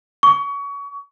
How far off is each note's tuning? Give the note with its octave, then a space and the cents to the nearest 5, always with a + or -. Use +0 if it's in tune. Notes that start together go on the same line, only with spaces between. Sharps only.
C#6 +30